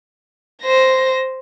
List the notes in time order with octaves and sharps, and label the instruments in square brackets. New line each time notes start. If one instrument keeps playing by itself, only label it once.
[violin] C5 A#6